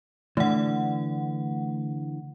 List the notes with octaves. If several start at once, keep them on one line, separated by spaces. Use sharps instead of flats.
D3 E3 A3 F#5